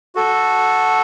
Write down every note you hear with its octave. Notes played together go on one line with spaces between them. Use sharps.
F#4 A4